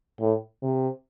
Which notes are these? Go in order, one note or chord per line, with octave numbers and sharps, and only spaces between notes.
A2
C3